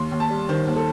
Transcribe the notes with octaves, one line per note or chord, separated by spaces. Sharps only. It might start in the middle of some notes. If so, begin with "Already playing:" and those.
Already playing: D#2 C6
D#2
A5
G3
D#3 C5
D#2
A4